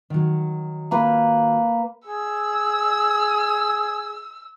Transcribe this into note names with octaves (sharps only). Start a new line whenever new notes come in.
D#3 F#3
A#3 B4
G#4 E6